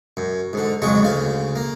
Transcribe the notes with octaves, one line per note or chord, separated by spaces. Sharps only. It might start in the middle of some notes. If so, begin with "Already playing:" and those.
F#2
G#2 D3
F2 C#3 F#3 G#3 C#6
D2 C#3 F5
A#3